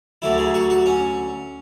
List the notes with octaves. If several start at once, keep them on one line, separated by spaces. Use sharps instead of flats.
D2 D3 F#3 E4
G#4
F#4
F#4
C#4